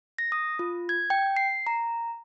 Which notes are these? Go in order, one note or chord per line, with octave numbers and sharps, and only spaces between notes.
A#6
D#6
F4
G#6
G5
C7
A#5